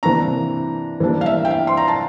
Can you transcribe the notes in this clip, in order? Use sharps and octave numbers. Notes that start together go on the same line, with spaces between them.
C3 E3 A#3 D4 A#5
E3 G3 A#3 D4
F5
E5
G5
F5
C6
A#5
A5